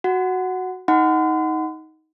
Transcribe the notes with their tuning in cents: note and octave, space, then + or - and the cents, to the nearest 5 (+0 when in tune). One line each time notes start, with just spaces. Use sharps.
F#4 +0 F#5 +0
D#4 +20 F#5 +0 C6 -45